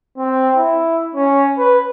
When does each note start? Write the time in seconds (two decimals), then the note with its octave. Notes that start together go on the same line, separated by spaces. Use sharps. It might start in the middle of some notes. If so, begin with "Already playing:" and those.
0.18 C4
0.57 E4
1.15 C#4
1.58 B4